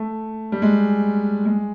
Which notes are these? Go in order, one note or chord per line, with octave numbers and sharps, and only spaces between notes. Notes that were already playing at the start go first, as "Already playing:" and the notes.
Already playing: A3
G3
G#3
G#3